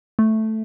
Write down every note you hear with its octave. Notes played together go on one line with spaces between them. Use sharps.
A3